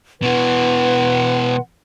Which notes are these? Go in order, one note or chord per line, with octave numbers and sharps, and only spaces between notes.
B2 E3 B4 F#5 C6